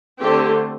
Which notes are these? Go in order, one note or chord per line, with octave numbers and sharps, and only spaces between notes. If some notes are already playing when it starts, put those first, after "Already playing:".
D3 A3 C4 G4